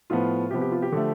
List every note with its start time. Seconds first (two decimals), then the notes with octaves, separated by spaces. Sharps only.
0.10 A2 F3 B3 F4
0.51 C3 F3 B3 G4
0.61 G4
0.72 F4
0.82 G4
0.92 D3 F3 A3